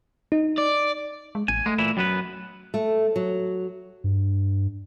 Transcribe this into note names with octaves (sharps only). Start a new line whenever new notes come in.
D#4
D5
G#3
A1 G#5
G#3 A3
A#2 E3 E4
F#2 F#3 B3 B4
A3
F#3
G2